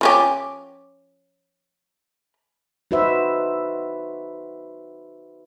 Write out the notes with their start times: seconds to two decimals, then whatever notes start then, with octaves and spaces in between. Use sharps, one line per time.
0.01 F3 C#4 G4
2.91 D#4 F#4 B4 C5 E5